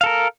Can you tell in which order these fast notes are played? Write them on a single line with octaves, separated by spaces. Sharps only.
F5 A4 A#4